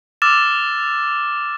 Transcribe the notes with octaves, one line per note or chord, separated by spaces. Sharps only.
D6 E6 F6 A6 E7